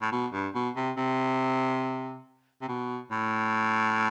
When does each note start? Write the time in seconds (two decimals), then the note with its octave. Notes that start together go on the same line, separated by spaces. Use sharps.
0.02 A2
0.12 B2
0.33 G2
0.54 B2
0.76 C3
0.97 C3
2.62 C3
2.68 B2
3.11 A2